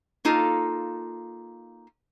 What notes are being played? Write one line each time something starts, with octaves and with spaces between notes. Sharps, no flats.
A#3 D#4 F4 A4